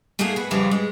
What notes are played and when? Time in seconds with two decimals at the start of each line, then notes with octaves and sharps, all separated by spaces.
0.19 A3 A#3 D#4 F#4 G#4
0.36 F#4 B4
0.51 F2 C#3 E3 F3 G3
0.71 G#3